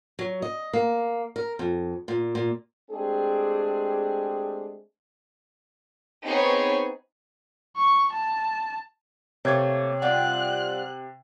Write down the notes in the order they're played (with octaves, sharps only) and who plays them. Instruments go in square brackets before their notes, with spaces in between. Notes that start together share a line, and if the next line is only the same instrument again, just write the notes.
[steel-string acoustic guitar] F#3
D#5
A#3
A#4
F2
A#2
A#2
[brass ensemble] G#3 A3 C4 D4 G4 G#4
[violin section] B3 C4 D#4 G#4 C#5
[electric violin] C#6
A5
[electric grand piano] C3 G#6 [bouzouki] A3 A#3 [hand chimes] C#5
[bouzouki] G3 C4 F4 [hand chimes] F#5 [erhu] F#6